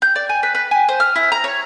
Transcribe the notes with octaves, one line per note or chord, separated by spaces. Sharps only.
G6
D5
G#5
B4
B4
G#5
C5
F6
E4
A#5
C#5